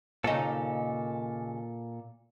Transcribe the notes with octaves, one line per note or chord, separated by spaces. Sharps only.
D#2 A#2 C#3 D#4 A4